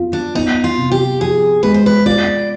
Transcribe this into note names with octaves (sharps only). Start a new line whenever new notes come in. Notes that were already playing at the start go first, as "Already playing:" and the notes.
Already playing: B3 F4
D4
B3 D#4
F4
C3
G4
F3 G#4
G#3 B4
C5
B4
F4 D5